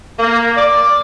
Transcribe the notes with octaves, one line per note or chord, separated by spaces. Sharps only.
A#3
D5